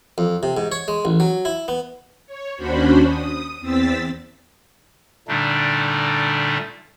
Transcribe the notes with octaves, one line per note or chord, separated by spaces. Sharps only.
F2
C3
G#2
C#5
G#3
A1
F#3
E4
B3
C#5
D#2 C#4 D4 F#4 C5 B5
D#6
E2 C4 E6 A6 B6
A#2 D3 G3 A3 D4 D#4